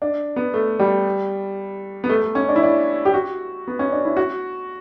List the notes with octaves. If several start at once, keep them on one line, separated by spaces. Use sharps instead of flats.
D4
B3
A3
G3
B3
A3
A3
C#4
D4
E4
D4
G4
F#4
B3
C#4
D4
E4
F#4